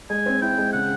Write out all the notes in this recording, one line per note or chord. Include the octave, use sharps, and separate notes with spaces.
G#3 G#5
C4
E4 G5
G#3
C#3 F#5